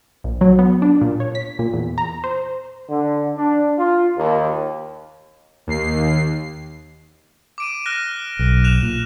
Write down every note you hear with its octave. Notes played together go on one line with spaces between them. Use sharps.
A#1
F#3
B3
D4
A#2
C#5
B6
A#2
E2
A#5
C5
D3
D4
F4
D#2
D#2 C7
D6 D7 D#7
F6 F#6 A#6
B1
F#6 E7 F7
A#2